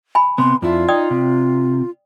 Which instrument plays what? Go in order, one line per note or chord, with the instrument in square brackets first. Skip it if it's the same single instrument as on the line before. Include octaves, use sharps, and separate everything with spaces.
[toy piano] G#5 B5
[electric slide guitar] C3 B3 [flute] C6
[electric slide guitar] F2 D4 E4 [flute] F4
[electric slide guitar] D#4 [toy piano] D5 G5 D#6
[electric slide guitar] C3